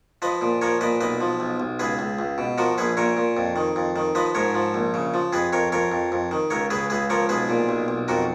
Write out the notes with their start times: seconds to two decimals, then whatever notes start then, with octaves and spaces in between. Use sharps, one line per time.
0.22 F3 B4 D#5
0.42 A#2
0.61 F3 A#4 C#5
0.81 A#2 B4 D#5
1.01 B1 B4 D#5
1.21 F3
1.40 B1
1.60 B1
1.79 C#2 G#4 B4
1.99 C#2
2.19 C#2
2.38 B2
2.58 F3 F#4 A#4
2.77 A#1 G#4 B4
2.97 A#2 A#4 C#5
3.17 A#2
3.37 F2
3.56 D#3
3.76 F2
3.96 D#3
4.15 F3 B4 D#5
4.35 G#2 A#4 C#5
4.54 F3
4.74 A#1
4.94 C#3
5.14 F3
5.33 F2 G#4 B4
5.52 F2 A#4 C#5
5.72 F2 A#4 C#5
5.92 F2
6.12 F2
6.31 D#3
6.50 C#2 A#4 C#5
6.70 C#3 G#4 B4
6.90 C#2 G#4 B4
7.10 F3 A#4 C#5
7.29 B1 G#4 B4
7.49 A#2
7.69 B1
7.88 B1
8.08 F2 F#4 A#4